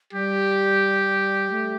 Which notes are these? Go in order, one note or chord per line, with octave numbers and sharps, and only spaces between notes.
G3 G4
A3